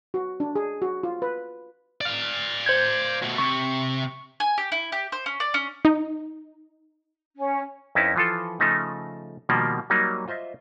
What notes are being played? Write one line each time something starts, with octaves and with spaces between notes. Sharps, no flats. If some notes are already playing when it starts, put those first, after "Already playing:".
F#4
D4
G#4
F#4
F4
B4
D5 F5
C5 G6 G#6
B2 A3
C3 C#6
G#5
G4
E4
G4
C5
C#4
D5
C#4
D#4
C#4
F2 C#4 D#4 E4 B4 A5
E3 F3 F4 A4
C#3 F3 A3 D#4
B2 D#3 F3 G3 A#3
F#3 G3 A#3 D#4
F4 C5 D#5 E5